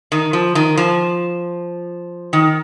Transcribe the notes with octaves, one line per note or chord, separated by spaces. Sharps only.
D#3
F3
D#3
F3
D#3